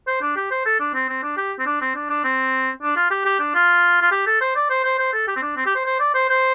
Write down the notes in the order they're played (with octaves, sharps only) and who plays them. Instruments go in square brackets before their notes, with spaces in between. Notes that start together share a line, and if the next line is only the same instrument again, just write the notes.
[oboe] C5
D4
G4
C5
A4
D4
C4
C4
D4
G4
C4
D4
C4
D4
D4
C4
D4
F4
G4
G4
D4
F4
F4
G4
A4
C5
D5
C5
C5
C5
A4
G4
C4
D4
C4
G4
C5
C5
D5
C5
C5